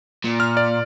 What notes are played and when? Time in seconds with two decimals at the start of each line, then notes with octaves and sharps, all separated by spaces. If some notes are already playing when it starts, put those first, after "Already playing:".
0.25 A#2
0.40 F6
0.57 D5